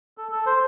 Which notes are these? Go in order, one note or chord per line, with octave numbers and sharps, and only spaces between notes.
A4
A4
C5